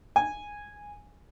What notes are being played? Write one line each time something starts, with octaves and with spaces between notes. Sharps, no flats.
G#5